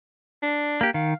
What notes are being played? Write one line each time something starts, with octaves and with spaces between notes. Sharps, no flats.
D4
A#3 G4
D#3 F5